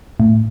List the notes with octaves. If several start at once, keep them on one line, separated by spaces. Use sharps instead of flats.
A2